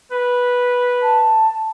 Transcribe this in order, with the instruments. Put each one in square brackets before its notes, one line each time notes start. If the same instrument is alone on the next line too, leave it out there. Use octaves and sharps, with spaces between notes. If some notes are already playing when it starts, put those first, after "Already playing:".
[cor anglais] B4
[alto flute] A5